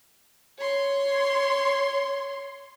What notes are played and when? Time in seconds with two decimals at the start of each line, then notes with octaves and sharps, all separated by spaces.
0.58 C#5 C6